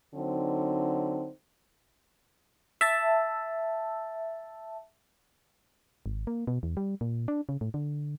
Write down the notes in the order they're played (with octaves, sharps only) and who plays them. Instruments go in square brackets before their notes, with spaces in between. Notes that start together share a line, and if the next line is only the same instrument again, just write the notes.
[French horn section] D3 F#3 C4 D#4
[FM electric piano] E5 A5
[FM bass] G#1
A#3
B2
E2
G3
A#2
D4
C#3
A2
D3